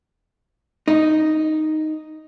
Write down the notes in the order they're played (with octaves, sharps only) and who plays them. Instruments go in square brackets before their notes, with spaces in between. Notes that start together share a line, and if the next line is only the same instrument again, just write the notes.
[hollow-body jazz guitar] D#4